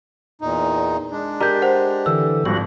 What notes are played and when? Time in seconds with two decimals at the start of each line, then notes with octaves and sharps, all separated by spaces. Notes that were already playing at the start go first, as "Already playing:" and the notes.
0.42 E2 A#2 D#4
1.11 G#3 D4
1.40 G4 A#4 D5 A#5 G6
1.62 C5 F#5
2.06 D3 E3 E6
2.46 G#1 F3 G3 F#4